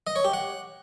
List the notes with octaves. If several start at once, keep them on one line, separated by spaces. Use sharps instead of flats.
D#5
C#5
G4
F#5